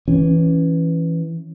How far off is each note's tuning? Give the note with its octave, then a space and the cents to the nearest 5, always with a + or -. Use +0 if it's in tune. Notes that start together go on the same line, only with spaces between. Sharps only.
E3 +0 C#4 +0